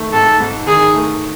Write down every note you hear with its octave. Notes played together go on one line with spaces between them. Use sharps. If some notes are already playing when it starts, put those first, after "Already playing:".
Already playing: D#3 A3
G#2 A4
G#2
D#3 G#4
A3